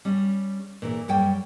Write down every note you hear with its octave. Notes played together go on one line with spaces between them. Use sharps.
G3 C#4
A#2 E3 A#4
F#2 G3 C#5 G5